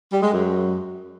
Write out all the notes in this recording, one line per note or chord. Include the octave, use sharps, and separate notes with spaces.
G3
G#3
F#2